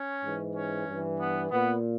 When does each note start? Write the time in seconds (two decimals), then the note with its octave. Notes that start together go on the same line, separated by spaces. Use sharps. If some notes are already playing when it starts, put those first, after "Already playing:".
Already playing: C#4
0.24 G#2 E3
0.56 C#4
0.87 G2 E3
1.20 B3
1.51 A#2 B3